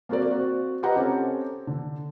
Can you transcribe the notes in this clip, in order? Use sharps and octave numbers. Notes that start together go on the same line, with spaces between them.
A#3 C4 F#4 A#4 D5
C4 F#4
F4 G4 B4 D#5 F#5 A#5
C4 C#4 G4 A4
D3